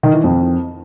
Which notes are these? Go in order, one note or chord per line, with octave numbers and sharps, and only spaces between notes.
D#3
E3
F2